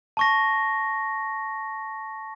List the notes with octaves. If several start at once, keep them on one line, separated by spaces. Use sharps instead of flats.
A5 C#6 A#6